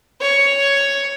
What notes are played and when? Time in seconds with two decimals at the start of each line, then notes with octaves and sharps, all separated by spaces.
0.21 C#5